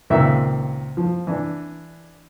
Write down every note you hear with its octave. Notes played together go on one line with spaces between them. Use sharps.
C#2 A#2 D#3 C4 E5
F3
E3 D4